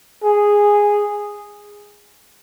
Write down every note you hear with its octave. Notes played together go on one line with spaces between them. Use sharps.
G#4